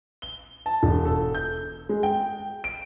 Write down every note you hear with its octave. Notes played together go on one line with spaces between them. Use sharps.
G7
A5
E1
A4
G6
G#3
G5
D7